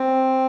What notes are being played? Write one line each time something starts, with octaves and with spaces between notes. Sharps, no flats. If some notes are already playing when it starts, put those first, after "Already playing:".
Already playing: C4